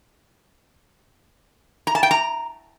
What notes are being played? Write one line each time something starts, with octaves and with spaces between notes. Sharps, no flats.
A#5
A5
G5
A#5